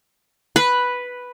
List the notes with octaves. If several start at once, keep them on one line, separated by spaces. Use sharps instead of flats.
B4